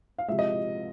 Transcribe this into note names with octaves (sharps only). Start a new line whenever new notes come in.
F5
C3 F3 G#3 E5
D#5